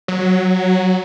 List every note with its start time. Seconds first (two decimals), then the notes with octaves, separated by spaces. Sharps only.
0.08 F#3